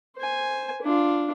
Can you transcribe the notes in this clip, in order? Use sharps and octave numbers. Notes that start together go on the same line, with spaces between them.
C5 G#5
D4 F4